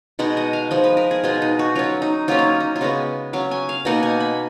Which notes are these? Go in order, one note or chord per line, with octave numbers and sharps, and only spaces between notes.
B2 G#3 D#4 F#5
D#5
F5
F3 G#3 D#4 D#5
B4
A#4
G#4
B2 G#3 D#4 F4
D#4
F#4
F#3 C#4 F4
D#4
F#3 A#3 C#4 F4
D#4
D#4
F4
C#3 G#3 B3 F#4
F#3 C#4 F5
G#5
F5
B2 A#3 D#4 F#5
G#5
B5